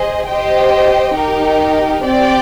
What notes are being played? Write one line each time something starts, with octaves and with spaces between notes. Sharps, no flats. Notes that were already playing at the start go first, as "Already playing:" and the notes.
Already playing: G#4 C5 D#5
G4 C5 D#5 G5
D#4 G4 A#4
C4 G4 D5 G5